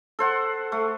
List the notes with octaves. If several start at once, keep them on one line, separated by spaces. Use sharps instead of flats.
A4 C5 F#5
A3